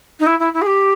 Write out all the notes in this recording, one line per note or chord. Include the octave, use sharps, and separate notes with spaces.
D#4
E4
E4
E4
G#4
G4